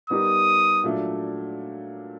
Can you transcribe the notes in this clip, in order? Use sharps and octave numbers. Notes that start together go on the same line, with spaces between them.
G3 B3 D#4 G4 A#4 D#6
A#2 F#3 A3 D4